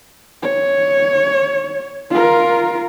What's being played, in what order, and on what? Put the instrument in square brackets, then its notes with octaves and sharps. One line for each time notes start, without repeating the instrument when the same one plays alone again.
[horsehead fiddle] C#5
F4 A#4